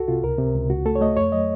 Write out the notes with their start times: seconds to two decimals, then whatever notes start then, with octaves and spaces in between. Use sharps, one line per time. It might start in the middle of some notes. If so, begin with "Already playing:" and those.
Already playing: C2 F#4 A4
0.08 C3 F4
0.23 C#2 A#4
0.39 C3
0.55 C#2
0.70 C#2 F#4
0.85 A3 A4
0.96 C#5
1.01 A3 D#5
1.17 F2 C#5
1.32 F#3 D#5